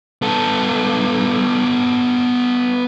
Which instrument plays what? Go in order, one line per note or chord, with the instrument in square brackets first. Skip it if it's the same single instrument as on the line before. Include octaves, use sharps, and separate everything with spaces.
[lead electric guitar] B3 A4